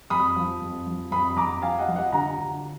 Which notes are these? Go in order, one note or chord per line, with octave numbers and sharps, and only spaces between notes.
F2 B5 D#6
F3
F2
F3
F2 B5 D#6
F2 A#5 D6
F3 F5 G#5
D#5 F#5
F3
D#5 F#5
D3 F#5 A#5
D2